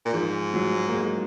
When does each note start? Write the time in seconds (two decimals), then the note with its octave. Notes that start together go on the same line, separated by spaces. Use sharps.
0.05 A#2
0.13 G#2 F3
0.53 F#3
0.88 A#3
0.93 G#3